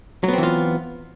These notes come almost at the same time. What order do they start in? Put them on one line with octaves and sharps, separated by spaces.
F#3 B3 C4 E3 F4